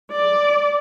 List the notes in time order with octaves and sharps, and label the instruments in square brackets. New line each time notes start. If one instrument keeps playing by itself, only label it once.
[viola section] D5